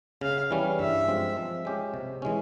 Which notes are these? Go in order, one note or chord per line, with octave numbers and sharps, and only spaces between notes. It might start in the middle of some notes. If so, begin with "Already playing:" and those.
C#3 F5
E3 G3 C#4
G2 E5
F3 G#3 C4 F4
F3
G#3 C#4 G4
C3
E3 G#3 C#4